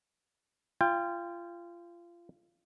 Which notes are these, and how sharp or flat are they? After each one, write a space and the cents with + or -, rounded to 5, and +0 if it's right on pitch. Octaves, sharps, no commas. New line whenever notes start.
F4 -25 G5 +20